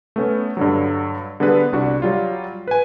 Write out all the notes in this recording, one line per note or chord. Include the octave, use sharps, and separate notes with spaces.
A3 B3 C#4
G2 D3 F#3
D3 G3 B3 G#4 A4 B4
C2 D4 F#4
F#3 G3 F4
B4 G#5